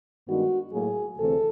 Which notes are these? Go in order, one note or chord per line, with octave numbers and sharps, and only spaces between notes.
G2 D#3 G#3 B3 D4 F#4
A2 F#3 A#3 G#4
D2 C3 E3 A3 C4 A4